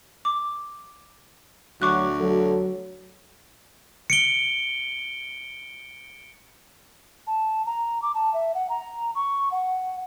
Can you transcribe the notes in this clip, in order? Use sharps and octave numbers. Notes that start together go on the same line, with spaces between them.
D6
D2 F#3 C#6 D6 F#6
F#3 A4
C#7 D7 G7
A5
A#5
D6
A5
E5
F#5
A#5
C#6
F#5